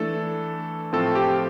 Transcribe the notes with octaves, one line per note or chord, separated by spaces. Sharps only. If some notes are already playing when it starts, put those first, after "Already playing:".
Already playing: E3 A3 D4 A4
A2 F3 A3 C4 F4 A4
G4